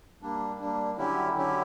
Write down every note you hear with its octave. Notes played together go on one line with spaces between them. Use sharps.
G3 A#3 D4
G3 A#3 D4
D3 F#3 C#4 E4 G4
D3 F#3 C#4 E4 G4